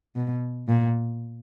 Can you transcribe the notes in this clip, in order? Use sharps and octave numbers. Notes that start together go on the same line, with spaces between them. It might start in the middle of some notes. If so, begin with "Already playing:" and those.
B2
A#2